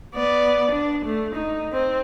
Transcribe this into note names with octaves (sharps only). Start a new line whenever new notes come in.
B3 D5
D4
A3
D#4
C4